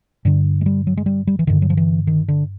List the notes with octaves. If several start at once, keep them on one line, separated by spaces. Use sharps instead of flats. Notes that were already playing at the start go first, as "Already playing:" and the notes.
G2 D3 D4
G#3
G3
F#3
G#3
G3
G3
E3
G2 D3 D#3
F#3
F3
E3
D#3
D3